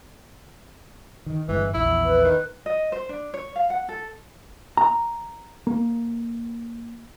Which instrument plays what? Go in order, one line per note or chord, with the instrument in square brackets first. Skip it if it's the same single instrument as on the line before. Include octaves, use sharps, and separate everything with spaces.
[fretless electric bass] D#3
[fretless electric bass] G1 G2 G#3 [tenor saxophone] E3
[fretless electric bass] A#1 E2 [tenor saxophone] E4
[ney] B4
[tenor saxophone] D#3
[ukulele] D#5
C5
D4
C#5
F5
F#5
A4
[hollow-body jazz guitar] A#5
A#3